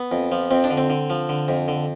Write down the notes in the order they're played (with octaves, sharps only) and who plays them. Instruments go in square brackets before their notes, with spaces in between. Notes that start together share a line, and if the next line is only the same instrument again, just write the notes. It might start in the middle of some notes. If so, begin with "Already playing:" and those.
Already playing: [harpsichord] B3
F2
F3
F2 C4
D4
D3
C4
D3
F3
D3
F2
D3